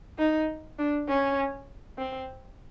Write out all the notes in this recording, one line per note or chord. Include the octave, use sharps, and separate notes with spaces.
D#4
D4
C#4
C4